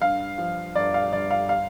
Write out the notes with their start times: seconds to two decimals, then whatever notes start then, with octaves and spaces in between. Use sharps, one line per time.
0.01 G2 F5
0.38 F3
0.75 G1 D5
0.94 F5
1.13 G1 D5
1.31 F5
1.49 F5